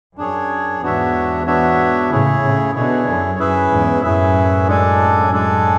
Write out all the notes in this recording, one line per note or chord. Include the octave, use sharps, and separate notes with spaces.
F#2 D4 G#4 C#5
E2 G#2 B3 D4 F#4 C#5 E5
B3 D4 F#4 C#5 E5
A2 C#3 E4 G#4 C#5
A2 C#3
B2 D3 E4 G#4 C#5
F#2
F#2 C#4 E4 G#4 B4 E5
E2 G#2
F#2 A2 C#4 E4 G#4 B4 E5
G#3 D4 A4 D5 G#5
G#3 D4 A4 D5 G#5